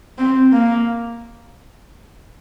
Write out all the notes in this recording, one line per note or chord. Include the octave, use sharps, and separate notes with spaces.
C4
A#3